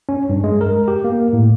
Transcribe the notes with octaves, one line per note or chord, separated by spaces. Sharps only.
C#4
G2
G#3
A#4
G4
A#3
A2